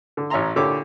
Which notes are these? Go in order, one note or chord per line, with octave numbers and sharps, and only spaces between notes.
D3
A1 C#5 E5 G#5 A#5 C6
A#2 D3 E4 G4 C#5 D6